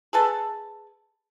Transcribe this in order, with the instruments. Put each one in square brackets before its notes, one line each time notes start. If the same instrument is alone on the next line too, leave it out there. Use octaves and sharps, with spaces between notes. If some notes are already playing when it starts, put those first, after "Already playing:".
[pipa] G#4 A4 B4 A5